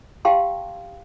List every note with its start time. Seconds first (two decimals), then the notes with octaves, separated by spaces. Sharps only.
0.25 G4 F5 G5 A5 C6